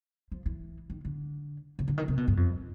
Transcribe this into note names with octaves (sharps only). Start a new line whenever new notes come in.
F3
E3
D#3
D3
C#3
D3
D#3
C3
B2
G2
F2